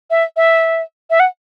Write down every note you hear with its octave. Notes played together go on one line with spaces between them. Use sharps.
E5
E5
E5
F#5